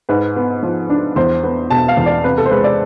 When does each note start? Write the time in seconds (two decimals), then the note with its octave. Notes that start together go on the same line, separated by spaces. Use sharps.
0.09 G#2 B4
0.36 B3
0.63 F3
0.90 D4
1.16 E2 C5
1.43 B3
1.70 B2 A5
1.88 F5
1.97 E2
2.06 D5
2.24 C3 B4
2.38 A4
2.46 C5
2.51 G#3 B4
2.64 D5